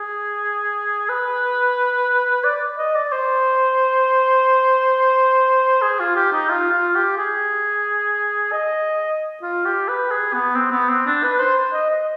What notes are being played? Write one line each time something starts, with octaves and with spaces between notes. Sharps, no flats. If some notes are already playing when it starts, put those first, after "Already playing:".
Already playing: G#4
B4
D5
D#5
D5
C5
G#4
F4
G4
D#4
F4
F4
G4
G#4
D#5
F4
G4
B4
G#4
B3
C4
B3
C4
D4
B4
C5
D#5
D#5